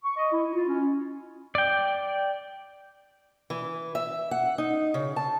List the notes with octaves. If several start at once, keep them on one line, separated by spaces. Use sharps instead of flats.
C#6
D#5
E4
F4
C#4
D5 G5
E3
E5
F#5
D#4
C#3
A5